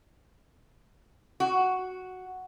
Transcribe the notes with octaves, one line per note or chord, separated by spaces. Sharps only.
F#4